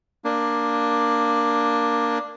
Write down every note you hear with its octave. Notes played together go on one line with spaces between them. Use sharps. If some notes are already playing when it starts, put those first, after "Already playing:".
A#3 D4